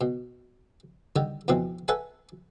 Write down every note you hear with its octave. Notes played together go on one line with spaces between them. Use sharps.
B2
D3 D#3 G3
F2 B2 E3 C4
A4 B4 E5 F#5 G#5